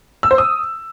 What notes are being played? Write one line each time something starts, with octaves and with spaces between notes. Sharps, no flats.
E6
C5
D#6